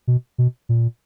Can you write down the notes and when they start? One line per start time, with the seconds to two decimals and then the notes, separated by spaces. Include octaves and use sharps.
0.07 B2
0.38 B2
0.69 A#2